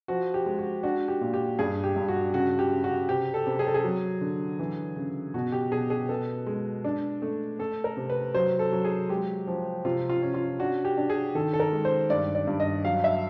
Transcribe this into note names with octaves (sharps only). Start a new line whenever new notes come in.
F3 F#4
G4
G#3
F#4
D4 F#4
G4
A#2
G4
G2 G#4
G4
G2
F#4
C#3 F#4
G4
C#3
F#4
C3 G4
A4
C3
G#4
A4
G#4
F#3
D3
E3
C#3
B2 F#4
G4
B2 G#4
G#4
B3 A4
G#3
D4
A3
A3 A4
A#4
C3
B4
F#3 C5
A4
F#3
G#4
G#3 G4
F3
C3 F4
F4
C#4
F4
D4 F#4
G4
D4
G#4
D#3 A4
A4
A#4
G#3
C5
G2 D5
D5
G2
D#5
F#3 F5
E5